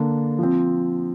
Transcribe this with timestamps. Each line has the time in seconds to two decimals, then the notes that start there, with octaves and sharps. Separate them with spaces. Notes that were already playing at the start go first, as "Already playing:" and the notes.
Already playing: D3 A#3 D4
0.38 F3 C4